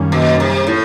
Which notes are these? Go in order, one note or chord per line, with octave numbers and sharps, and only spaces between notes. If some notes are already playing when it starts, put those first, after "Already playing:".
Already playing: F#2 D#3 G3 A#3 C#4
B2
C3
A2